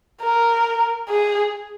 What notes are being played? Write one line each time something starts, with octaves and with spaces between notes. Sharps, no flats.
A#4
G#4